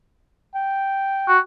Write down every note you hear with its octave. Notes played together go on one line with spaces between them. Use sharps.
G5
F#4